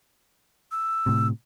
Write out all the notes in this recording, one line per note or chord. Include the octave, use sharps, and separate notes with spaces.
E6
A2 C3